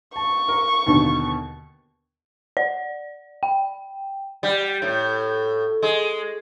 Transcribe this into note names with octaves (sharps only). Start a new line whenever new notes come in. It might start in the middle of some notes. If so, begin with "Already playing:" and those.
A5 C#6
A#4
D#2 B2 D3
D5
G5
G3
A2
G#3